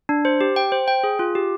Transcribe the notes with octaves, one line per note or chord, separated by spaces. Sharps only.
D4
C5
G4
G5
C5
G5
G#4
F4
G4